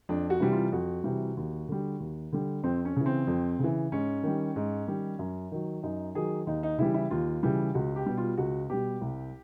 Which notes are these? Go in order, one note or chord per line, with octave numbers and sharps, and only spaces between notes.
F2 D4
F#4
C3 E3 G3
F4
F2 F#4
C3 E3 G3
D#2
D3 G3
D#2
D3 G3
F2 C4
C#4
C#3 E3
C4
F2
C#3 E3
G#2 C#4
D#3 G3
G#2
D#3 G3
F#2
D#3 F#3
F#2 D#4
D#3 F#3 G#4
D#2 D#4
D#4
C#3 E3 G3 E4
E4
D#2 F4
C#3 E3 G3
C#2 F#4
G4
B2 G3
F4
C#2 F#4
B2 G3 G4
C2